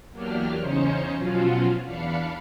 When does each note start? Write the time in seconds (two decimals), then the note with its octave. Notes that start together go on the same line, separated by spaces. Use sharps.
0.11 E2 F#3 A#3 D4 G4 F6
0.58 E2 C#3 C#4 D#4 C5 C#7
1.13 B2 F3 F#3 C#4 F4 F#4
1.82 E2 D4 F5 B5 C#7